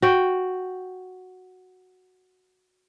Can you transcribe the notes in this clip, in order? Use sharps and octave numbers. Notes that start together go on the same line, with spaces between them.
F#4 G5